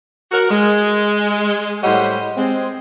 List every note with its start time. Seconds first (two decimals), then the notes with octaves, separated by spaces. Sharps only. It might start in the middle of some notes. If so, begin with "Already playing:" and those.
0.31 F#4 A#4
0.50 G#3
1.82 A2 G3 C5 C#5 D#5 F#5
2.36 G#3 C4